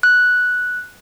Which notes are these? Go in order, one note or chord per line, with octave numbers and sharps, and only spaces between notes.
F#6